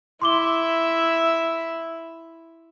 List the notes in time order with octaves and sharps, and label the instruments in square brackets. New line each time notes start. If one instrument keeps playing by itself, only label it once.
[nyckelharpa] E4 E5 [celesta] C6 D6 G7